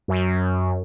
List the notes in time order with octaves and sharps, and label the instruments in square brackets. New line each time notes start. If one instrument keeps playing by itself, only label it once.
[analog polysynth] F#2